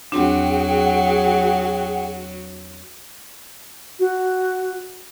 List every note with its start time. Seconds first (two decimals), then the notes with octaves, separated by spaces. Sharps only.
0.12 E2 F#3 C4 D4 G#4 F#5 G5
4.00 F#4